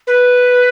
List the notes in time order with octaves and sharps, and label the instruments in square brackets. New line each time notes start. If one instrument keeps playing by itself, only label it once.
[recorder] B4